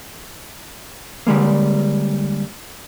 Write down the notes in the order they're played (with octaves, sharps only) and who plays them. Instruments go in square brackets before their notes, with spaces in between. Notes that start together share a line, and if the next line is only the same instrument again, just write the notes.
[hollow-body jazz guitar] D3 G3 G#3 A#3